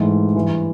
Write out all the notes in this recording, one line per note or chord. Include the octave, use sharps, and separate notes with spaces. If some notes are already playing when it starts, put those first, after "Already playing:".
Already playing: G#2 E3 A3
G2 E3 G3